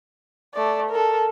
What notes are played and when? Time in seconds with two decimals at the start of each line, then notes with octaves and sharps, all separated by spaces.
0.54 A3 D5
0.90 A4 A#4